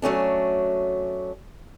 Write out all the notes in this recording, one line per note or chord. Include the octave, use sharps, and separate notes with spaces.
F#3 A3 C#4 D4